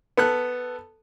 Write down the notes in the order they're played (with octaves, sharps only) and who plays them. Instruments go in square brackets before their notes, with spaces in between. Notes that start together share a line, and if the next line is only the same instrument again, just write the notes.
[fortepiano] B3 A4 F#6